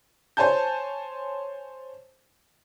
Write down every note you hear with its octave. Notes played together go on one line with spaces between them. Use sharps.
C5 C#5 G#5 A5 G6